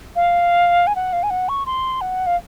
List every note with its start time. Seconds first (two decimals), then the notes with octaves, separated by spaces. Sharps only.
0.16 F5
0.87 G#5
0.96 F#5
1.13 F5
1.23 G#5
1.30 F#5
1.49 C#6
1.66 C6
2.01 F#5
2.26 F5